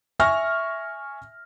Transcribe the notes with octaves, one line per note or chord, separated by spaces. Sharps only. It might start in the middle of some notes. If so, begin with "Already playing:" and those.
E5 G#5 C#6 F6 A#6